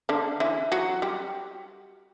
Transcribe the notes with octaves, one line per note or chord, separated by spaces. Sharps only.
D3 D4
E3 E4
F#3 F#4
G3 G4